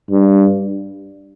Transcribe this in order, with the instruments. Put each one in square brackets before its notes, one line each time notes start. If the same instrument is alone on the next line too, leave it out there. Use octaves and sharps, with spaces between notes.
[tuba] G2